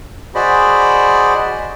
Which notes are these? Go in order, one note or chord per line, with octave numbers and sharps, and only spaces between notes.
F#4 G#4 C5 D5 D#5 B5